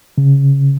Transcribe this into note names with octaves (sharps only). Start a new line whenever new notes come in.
C#3